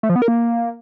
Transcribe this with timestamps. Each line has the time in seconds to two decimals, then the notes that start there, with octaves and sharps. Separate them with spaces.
0.03 A3
0.09 F3
0.16 B3
0.22 A#4
0.28 A#3